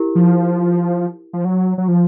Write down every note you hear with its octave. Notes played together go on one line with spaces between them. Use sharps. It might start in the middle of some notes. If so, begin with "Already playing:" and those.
Already playing: E4 G4 A#4
F3
F3
F#3
F#3
F3